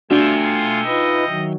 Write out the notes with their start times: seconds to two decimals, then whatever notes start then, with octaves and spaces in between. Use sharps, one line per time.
0.11 A3 D4 F4 F#4 E5 G5 G#5
0.43 F4
0.86 D#4 F4 B4 D#5
1.27 D#3 F#3